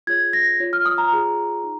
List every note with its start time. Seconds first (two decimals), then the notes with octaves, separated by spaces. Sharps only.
0.07 F4 G#4 C#5 G#6
0.33 A#6
0.60 F4 C#5
0.73 F6
0.86 D#6
0.98 A#5
1.12 F4 G#4 C#5
1.64 D#4